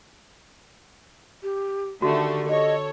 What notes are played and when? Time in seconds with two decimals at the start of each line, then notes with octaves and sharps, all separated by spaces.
1.43 G4
2.02 D3 D#3 A3 F#4 G4
2.49 A4 C#5 D#5